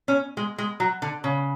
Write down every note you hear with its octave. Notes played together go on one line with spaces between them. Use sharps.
C#4
G#3
G#3
F#3
D3
C#3